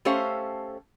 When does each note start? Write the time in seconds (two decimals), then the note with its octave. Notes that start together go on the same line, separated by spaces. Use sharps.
0.05 A3 C#4 G4 A4 C5 F5